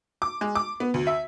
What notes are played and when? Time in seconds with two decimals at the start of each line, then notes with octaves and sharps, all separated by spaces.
0.22 D6
0.41 G#3
0.55 D6
0.80 B3
0.94 D2
1.07 E5